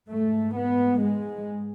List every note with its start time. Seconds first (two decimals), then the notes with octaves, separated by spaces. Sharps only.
0.11 G#2 A3
0.56 B3
1.01 G#3